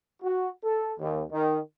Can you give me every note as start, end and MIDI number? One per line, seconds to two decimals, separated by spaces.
0.22 0.49 66
0.64 0.93 69
0.99 1.23 39
1.31 1.59 51